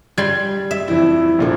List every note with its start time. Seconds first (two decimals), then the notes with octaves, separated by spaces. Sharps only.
0.18 G3 C6 G#6
0.71 E5
0.88 F2 E3 E4
1.39 A#1 A#2 A4